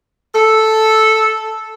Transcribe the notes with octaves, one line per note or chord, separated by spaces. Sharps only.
A4